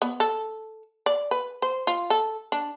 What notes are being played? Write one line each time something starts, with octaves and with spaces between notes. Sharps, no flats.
B3
A4
D5
B4
C5
F4
A4
D4